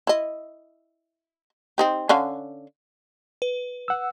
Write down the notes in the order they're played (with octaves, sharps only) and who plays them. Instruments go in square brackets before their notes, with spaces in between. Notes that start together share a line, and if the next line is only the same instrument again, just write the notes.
[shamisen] E4 D#5
C4 D#4 G4
D3 C#4 F5
[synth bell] B4
[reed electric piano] F#5 E6